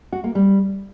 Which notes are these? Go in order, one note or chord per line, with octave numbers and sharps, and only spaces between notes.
F#4
A#3
G3